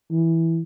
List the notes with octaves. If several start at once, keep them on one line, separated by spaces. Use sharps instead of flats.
E3